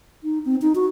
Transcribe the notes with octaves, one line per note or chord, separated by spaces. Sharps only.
D#4
C4
D#4
F#4